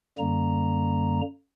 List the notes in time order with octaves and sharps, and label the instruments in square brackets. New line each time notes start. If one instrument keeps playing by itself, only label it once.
[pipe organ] F#2 D3 G3 A#3 A#5